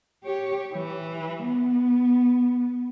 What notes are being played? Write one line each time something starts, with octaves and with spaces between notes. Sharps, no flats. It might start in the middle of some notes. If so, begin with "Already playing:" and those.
G4 C#5
E3
B3